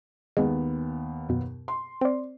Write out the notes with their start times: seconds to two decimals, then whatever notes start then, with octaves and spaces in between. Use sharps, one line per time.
0.37 D#2 G#3 B3
1.29 F#2 B2
1.68 C6
2.01 C4 D5